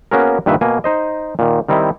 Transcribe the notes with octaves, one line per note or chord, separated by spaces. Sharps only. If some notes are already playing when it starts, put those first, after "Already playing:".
A#3 B3 C#4 F#4 G#4 A#4
G2 A#2 D#3 B4 E5
B2 A#3 G#5
D#4 C5 D#5
A#2 D#3
D#3 G3 C4 D#4 E4